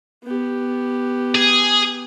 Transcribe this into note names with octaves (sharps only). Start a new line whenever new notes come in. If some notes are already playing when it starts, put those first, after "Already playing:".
B3 G4
G#4